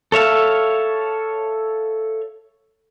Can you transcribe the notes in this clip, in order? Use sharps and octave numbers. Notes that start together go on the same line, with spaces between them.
A4 C#5 E5 F5